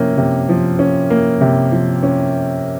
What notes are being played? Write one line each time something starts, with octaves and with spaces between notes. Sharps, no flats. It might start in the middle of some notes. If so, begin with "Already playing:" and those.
Already playing: C3 F3 A#3 C#4
C3
F3
C#4
A#3
C3
F3
C#4